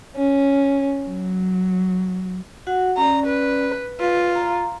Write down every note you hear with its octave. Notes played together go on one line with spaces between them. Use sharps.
C#4
F#3
F#4 F#5
C#4 D5 A#5
B4
F4 B4
A#5